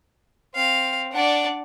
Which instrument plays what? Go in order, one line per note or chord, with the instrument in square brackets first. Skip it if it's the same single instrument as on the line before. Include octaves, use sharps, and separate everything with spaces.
[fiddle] C4 [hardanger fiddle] F5
[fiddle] D4 D5 [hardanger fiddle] F#5